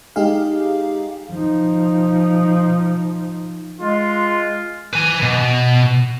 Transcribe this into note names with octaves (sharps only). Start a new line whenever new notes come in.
G#3 D#4 G4 G#4 F5
F3 D#4
G#3 F4
B4 G#5
B2